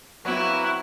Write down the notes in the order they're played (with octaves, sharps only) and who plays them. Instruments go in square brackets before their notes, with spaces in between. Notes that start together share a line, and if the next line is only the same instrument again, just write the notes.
[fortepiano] F#3 C4 [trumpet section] A#3 F#4 [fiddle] E4 [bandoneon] B4